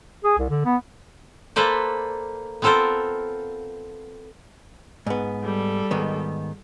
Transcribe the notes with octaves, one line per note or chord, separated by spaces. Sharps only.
G#4
C2
D3
B3
A#3 A4 B4 C5 D5
B3 C4 F4 A4 A#4 C5
G#2 B3
G3 A4
G#2 D#3 B3